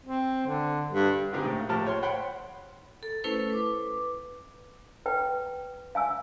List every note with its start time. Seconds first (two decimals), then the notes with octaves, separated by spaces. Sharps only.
0.05 C4
0.46 D3
0.92 G2
1.32 D3 G#3 C4 D#4 G4 G#4
1.45 A2
1.58 A#3
1.69 A2 F3 G4 A5 F6
1.87 C#5 C6
2.02 C5 C#5 F#5 G5 B5 C6
3.03 A4
3.24 A3 C#4 E4 A4 B4 C5
3.50 B4 D6
5.06 B4 G5
5.95 F5 G#5 E6